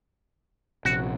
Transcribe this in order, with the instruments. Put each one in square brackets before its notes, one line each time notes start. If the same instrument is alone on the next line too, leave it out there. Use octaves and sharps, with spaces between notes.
[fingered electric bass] A#1 C3 [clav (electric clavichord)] F#4